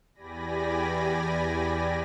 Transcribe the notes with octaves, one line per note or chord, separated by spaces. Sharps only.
E2 G4 D5 G#5 B5 A#6